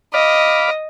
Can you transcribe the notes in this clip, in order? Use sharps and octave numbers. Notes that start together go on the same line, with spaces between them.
D#5 F5 B5 D6